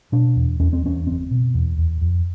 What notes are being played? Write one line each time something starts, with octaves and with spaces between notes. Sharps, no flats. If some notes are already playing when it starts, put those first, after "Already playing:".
B2 D4
E2
E2 C#4
C4
E2 C#4
F#1 C4
B2
E2
E2
F2